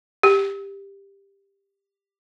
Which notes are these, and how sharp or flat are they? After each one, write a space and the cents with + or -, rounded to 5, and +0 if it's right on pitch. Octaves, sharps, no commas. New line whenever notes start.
G4 +15